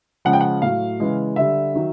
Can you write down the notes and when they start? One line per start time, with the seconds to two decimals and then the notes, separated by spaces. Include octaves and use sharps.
0.25 C#3 F3 G#3 F#5
0.33 G5
0.41 F#5
0.62 A2 F#3 F5
1.00 C#3 E3 G#3
1.36 D3 G3 E5
1.74 D#3 F#3